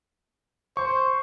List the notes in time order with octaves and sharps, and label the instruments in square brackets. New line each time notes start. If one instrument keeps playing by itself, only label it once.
[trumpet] C5 [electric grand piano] C#6